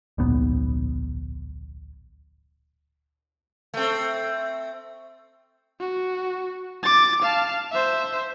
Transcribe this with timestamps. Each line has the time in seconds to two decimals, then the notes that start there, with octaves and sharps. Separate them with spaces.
0.18 D1 A#1 G#2 B3
3.74 A3 C4
5.80 F#4
6.83 D6 A6
7.22 F5 A5
7.72 C5 E5